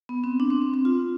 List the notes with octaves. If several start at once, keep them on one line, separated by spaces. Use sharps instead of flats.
B3
C4
D4
C4
C4
C4
F4